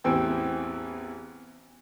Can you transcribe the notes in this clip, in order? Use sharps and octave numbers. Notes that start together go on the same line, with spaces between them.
A1 E2 E3 C4 G5 E6